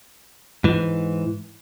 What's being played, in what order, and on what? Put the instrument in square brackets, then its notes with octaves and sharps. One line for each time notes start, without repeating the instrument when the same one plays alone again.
[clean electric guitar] G#2 E3